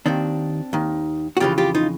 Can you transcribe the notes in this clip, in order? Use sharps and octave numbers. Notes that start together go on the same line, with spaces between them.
D#2 D#3 C4 D4
D#2 D#3
F#4
F2 C#3 E3 F4 G4
F4 G4
D#4 F4